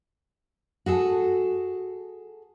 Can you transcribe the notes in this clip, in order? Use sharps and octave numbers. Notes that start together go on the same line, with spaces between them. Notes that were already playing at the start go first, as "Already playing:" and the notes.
F#4 G#4 A4